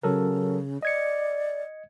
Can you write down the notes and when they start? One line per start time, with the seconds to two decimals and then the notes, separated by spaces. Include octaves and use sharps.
0.03 C#3 F#3 A4 A#4
0.83 D5 D#5 G#6 C#7